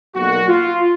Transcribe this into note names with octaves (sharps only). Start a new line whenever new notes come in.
B1 A#2 F#4
F4